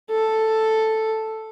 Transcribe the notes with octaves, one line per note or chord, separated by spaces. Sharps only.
A4